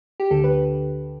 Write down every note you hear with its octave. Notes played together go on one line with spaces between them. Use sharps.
G4
D2 D3 A4
B4